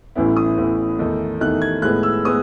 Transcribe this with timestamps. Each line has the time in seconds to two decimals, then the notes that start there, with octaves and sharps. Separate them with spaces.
0.15 A1 A2 E3 B3 E4
0.37 D#6
0.58 A1 A2 E3 B3 E4
0.99 E2 D#3 A3 D#4
1.40 E2 D#3 A3 D#4 F#6
1.62 G#6
1.82 A2 G#3 B3 F#6
2.03 E6
2.25 G#3 B3 D#6